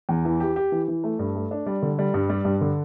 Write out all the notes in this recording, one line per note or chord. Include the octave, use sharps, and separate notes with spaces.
E2
E3
G4
G4
E3
E3
A3
G2
A3
D4
G3
D3
G3
G2
G3
G2
D3